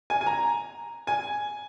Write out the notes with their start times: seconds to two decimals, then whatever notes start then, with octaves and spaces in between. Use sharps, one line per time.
0.10 G#5
0.21 G#5
0.26 A#5
1.07 G#5